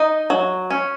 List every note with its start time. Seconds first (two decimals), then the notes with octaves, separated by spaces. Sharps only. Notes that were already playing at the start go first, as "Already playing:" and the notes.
Already playing: D#4 D#5
0.30 F#3
0.70 C#4